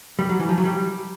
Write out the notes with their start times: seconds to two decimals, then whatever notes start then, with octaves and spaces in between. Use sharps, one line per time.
0.19 G3
0.29 F#3
0.40 E3
0.49 F3
0.58 F#3
0.65 G3